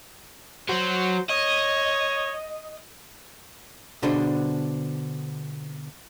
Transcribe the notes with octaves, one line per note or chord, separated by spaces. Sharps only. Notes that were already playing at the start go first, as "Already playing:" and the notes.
F#3 F#4 C5
C#5 D#5
B2 D3 D4 G#4 C5